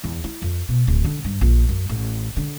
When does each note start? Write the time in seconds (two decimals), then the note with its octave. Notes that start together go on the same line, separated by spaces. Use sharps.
0.04 E2
0.24 E4
0.42 F2
0.68 B2
0.87 D1
1.04 D3
1.24 G2
1.41 A#1
1.69 F#2
1.89 A1
2.36 D3